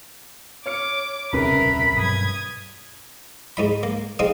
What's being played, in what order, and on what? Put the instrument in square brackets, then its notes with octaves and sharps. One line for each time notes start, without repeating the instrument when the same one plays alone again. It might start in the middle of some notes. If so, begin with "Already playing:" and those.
[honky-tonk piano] C#5 F6 C#7 [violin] D6
[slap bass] D#1 C2 [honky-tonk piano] F2 C#3 B4 [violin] A#4 E5 [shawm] B5
[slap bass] G2 B2 F#3 [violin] D#6 G#6
[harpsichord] G#2 D#4 B5
A#3
C4 D#4 G#4 F5